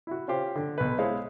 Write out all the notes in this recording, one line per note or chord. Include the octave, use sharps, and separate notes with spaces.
E4 F#4
C#4 F4 G4 C5
D3
B1 B4
G#3 E4 C5 C#5 D#5 F5